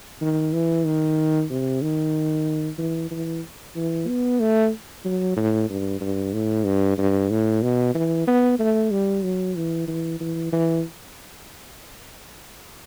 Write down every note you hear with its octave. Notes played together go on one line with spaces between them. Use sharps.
D#3
E3
D#3
C3
D#3
E3
E3
E3
B3
A3
F#3
A2
G2
G2
A2
G2
G2
A2
B2
E3
B3
A3
G3
F#3
E3
E3
E3
E3